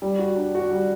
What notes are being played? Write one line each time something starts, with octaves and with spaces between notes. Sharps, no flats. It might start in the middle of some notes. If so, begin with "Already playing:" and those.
G3
F#4
D4
F#4
G3